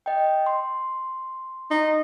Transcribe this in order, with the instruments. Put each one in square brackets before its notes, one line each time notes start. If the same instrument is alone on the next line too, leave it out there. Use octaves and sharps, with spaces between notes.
[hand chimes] D#5 G5
C6
[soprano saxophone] D#4